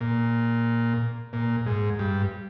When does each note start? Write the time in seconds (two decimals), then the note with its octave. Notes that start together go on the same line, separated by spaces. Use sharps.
0.01 A#2
1.33 A#2
1.66 G#2
1.99 G2